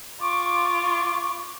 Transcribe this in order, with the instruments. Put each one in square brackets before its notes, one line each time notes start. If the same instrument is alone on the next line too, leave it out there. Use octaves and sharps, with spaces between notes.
[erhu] F4 [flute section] C#6 [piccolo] D6